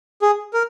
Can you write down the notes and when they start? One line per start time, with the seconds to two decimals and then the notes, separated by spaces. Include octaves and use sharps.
0.22 G#4
0.53 A#4